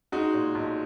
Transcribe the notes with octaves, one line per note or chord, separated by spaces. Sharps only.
G#3 D#4 F#4
A#2
B1